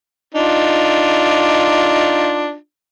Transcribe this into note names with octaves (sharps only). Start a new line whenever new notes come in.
D4 D#4 F4